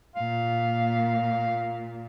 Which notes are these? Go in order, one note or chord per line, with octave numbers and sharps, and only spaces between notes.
A#2 F5